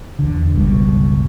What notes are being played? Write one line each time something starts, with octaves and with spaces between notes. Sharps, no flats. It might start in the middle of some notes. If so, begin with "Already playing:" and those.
E2 D3
G1 C#2 B2 G3